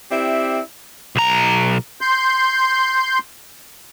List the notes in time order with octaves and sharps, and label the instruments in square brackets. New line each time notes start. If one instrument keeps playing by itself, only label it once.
[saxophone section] C4 E4 G4 D5 E5
[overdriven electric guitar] B1 A#5
[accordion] C6 G6